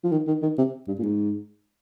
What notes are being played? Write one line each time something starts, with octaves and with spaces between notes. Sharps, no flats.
F3
D#3
D#3
D#3
C3
G2
A#2
G#2